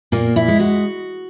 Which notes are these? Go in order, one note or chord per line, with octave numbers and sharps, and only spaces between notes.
A#2 A#3
E4
G#3
F#4